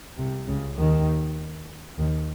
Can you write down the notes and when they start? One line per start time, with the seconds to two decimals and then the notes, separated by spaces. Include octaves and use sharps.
0.17 C2 C3
0.47 C#2 C#3
0.77 D#2 D#3
1.98 D#2 D#3